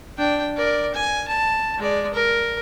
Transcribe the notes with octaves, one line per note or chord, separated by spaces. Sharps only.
D4 G5
A#4 D5
G#5
A5
G#3 D5
A#4